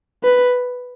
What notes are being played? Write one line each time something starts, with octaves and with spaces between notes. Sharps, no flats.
B4